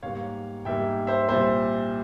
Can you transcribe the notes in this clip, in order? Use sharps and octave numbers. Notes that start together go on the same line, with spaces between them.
G#2 G3 A#3 C#5 F5
G#2 G3 A#3 E5 G5
C5 E5
C2 A#2 G3 C5 E5